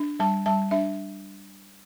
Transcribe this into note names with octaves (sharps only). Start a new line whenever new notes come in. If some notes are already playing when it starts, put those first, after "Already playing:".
Already playing: D4
G3 A5
G3 A5
D4 E5